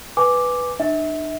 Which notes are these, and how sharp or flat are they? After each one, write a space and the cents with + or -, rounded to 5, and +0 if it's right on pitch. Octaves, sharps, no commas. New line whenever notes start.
B4 +0 G#5 +0 D6 +0
D4 +45 E5 -30